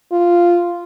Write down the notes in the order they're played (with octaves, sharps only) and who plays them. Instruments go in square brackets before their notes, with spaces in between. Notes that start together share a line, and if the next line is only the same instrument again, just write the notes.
[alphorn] F4